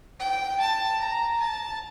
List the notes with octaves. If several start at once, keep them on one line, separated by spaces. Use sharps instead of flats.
G5
A5
A#5
A5